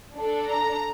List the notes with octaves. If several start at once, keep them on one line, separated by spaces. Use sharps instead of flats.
D4 A4
A#5